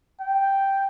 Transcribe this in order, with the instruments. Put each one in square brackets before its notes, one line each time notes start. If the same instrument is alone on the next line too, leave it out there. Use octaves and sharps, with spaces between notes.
[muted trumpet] G5